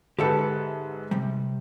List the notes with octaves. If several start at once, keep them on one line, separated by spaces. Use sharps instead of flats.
G#2 D3 G4 A4 B4 E5 F#5
C3 G3